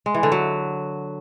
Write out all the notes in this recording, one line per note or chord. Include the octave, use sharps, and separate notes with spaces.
G#3
E3
D3
F#3